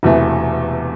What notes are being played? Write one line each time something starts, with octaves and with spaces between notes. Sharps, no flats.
E1 E2 C3 E3 A3